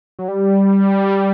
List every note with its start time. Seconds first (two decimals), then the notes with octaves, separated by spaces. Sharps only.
0.19 F#3
0.28 G3